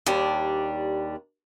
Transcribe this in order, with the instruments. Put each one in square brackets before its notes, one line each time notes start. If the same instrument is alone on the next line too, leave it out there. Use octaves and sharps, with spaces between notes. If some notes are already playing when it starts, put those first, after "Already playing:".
[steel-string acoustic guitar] D#2 G3 D4